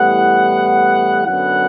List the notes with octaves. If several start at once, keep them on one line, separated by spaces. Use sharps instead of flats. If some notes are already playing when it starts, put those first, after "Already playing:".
Already playing: A2 E3 G3 B3 F#5
F#2 D3 F#3 B3 F#5